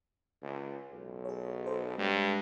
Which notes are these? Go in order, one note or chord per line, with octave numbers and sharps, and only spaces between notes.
C#2
B1
G#4 C#5
A4 C5
G2 G#3